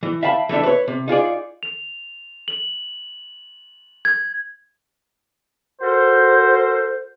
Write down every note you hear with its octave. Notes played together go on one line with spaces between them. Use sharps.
E3
E5 F5 G5 A5 B5
E3 A3 D4 E5
B4 C#5
C3
D#4 F4 G#4 D5
F7
F#7
G#6
F#4 A4 A#4 C5